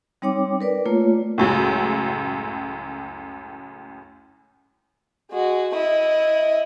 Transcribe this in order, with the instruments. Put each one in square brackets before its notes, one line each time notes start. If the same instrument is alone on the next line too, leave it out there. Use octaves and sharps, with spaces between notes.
[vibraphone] G3 C4 D#4 C#5 G5 D6
A#4 B4 D5
A3 A#3 F4 C#5
[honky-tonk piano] C#2 F#2 A2
[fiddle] G#3 F#4
E4 D#5